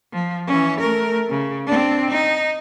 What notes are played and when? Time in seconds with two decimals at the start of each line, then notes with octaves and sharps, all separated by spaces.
0.13 F3
0.47 E3 C#4
0.80 A3 A#4
1.29 C#3
1.67 C4 D4
2.10 D#4